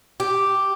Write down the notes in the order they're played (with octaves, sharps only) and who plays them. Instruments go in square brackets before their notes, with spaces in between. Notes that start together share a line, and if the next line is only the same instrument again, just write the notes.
[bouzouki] G4